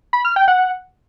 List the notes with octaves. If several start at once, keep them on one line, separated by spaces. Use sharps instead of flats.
B5
F6
G5
F#5